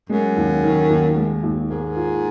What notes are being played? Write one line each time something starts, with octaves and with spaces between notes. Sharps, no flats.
F#2 G#3
D#2
D#3
D#2
G#3
D#2
G#2 A#3
F4